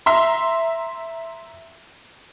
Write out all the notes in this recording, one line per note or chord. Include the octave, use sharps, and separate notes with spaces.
E5 A#5 C6